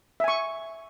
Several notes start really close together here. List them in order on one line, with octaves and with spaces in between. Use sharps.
E5 G#5 C#6